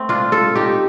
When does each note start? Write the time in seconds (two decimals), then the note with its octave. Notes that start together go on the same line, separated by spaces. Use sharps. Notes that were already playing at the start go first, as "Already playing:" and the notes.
Already playing: A3 C4
0.09 D4 F4
0.32 F4 A4
0.55 D#4 G4